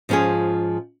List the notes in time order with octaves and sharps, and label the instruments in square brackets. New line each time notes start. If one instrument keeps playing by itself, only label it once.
[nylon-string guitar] G#2 F3 C#4 F4 G#4